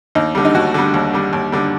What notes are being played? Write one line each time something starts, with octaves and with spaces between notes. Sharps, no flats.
D#2 D#4
D3 G3
D#4
D#2 F#4
D3 G3
D#2
D3 G3
D#2
D3 G3